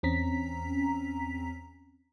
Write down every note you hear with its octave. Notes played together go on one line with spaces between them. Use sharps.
E2 C4 C#4 A#5 B6